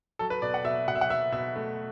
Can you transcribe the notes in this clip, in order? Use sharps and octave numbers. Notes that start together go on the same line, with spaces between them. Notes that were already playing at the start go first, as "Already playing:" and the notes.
F#3 A4
B4
B2 D5
F#5
B2 E5
B2 F#5
E5
F#5
F#3 E5
B2 E5
A3